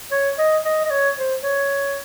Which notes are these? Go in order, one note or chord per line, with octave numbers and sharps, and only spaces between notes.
C#5
D#5
D#5
D#5
C#5
C5
C#5